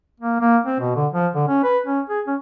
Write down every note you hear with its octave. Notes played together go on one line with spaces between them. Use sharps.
A#3
A#3
C4
B2
D3
F3
D3
C#4
B4
C#4
G#4
C#4